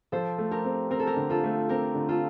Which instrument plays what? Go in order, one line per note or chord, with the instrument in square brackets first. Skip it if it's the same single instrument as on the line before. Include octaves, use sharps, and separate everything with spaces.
[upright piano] F3 [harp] A4 C5
[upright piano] A3
[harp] G4 A#4
[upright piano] C4
[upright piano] C4 [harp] A#4
[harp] A4
G4 A#4
[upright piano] D3
[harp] F4 A4
[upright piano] A3
[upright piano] C4 [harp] G4 A#4
[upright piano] D3
[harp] F4 A4